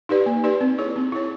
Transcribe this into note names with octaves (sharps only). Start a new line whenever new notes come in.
D#4 G4 B4 D5
A#3
D#4 G4 B4 D5
C4
E4 G#4 C#5
C4
E4 G#4 C#5